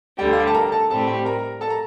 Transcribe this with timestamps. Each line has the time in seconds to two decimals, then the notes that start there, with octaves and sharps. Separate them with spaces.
0.19 D2 D3 G3 G4 G5
0.33 F5
0.40 G5
0.47 A5
0.55 A#4 A#5
0.72 A4 A5
0.90 A2 G3 C4 A4 A5
1.07 G4 G5
1.25 A#4 A#5
1.61 A4 A5
1.70 A#5